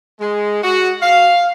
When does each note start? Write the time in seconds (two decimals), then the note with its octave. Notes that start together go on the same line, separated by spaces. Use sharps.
0.21 G#3
0.63 F#4
1.02 F5